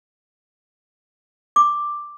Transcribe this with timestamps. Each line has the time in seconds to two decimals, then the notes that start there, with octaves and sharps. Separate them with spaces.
1.56 D6